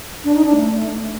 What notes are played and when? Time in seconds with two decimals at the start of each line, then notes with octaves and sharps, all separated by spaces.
0.24 D4
0.35 D#4
0.45 D4
0.56 A3